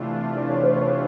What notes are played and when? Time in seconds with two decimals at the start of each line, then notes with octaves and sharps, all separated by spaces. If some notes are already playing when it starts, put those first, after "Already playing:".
Already playing: C3 E3 A3 D4 F4
0.37 D5
0.50 C#5
0.63 C5
0.76 C#5